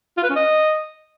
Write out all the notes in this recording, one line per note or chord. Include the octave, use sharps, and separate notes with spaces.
F4
B4
C#4
D#5